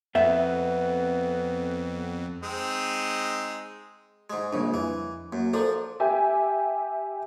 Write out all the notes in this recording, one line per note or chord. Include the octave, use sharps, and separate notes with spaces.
F2 B3 E5
G#3 C4 D#4
G#2 G#3
A#1 C#3 G3 A#3 D4
F2 E3
F#2 A#3
F3 D4 A4 A#4 C5
G4 E5 G#5